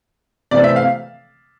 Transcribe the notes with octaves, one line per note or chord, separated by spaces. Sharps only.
C3 E3 A3 C4 D5
E5
F5